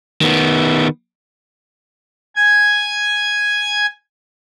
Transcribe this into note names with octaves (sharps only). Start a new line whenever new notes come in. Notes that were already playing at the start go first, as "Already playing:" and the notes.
D#3 B3
G#5 G#6